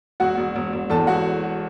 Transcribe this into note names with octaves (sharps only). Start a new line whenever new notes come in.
E1 F#4 F#5
E1
E1
E1
E2 A4 A5
E1 F#4 F#5